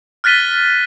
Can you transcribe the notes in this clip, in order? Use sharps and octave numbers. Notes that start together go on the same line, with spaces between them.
F6 F#6 A6 B6 D#7 G7